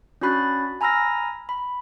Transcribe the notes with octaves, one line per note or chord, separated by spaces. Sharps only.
C#4 D4 F#4 B5 F#6 A6
G#5 A#5 B5 E6 F6 A#6
B5